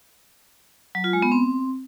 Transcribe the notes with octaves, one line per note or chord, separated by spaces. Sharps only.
F#3
F4
G#3
B3
C4